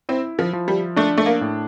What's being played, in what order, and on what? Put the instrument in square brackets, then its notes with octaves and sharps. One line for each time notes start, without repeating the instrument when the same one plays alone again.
[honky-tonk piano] C4 [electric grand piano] E4
[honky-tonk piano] F3
[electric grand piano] F3
[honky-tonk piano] G3
[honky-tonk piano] A3 [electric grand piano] D4
[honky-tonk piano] A3
A#3
[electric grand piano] A2